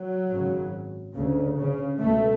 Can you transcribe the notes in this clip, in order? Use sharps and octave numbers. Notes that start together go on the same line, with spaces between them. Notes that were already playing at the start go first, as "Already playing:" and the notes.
Already playing: F#3
G#1 F#2 C#3
D2 C#3
C#3
C#2 B2 A3